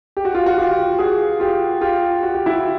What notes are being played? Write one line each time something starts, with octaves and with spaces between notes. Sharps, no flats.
G4
F#4
F4 G4
F#4
F4 G4
F#4 G#4
F4 G4
F4 G4
F#4
G4
E4 F#4